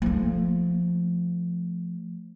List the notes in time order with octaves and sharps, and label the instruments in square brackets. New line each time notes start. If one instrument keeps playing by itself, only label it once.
[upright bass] F3 A3